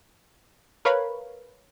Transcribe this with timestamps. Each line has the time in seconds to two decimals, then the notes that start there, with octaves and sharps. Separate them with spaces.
0.85 A#4 B4 C#5 F5 B5